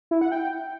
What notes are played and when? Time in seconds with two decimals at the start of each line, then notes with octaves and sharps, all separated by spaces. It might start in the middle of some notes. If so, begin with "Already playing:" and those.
0.11 E4
0.21 F#5
0.32 G5